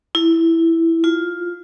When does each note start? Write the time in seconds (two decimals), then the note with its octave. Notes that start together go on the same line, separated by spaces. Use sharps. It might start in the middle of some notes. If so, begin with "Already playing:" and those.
0.15 E4
1.04 F4